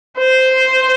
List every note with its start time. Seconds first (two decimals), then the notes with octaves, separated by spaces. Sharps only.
0.18 C5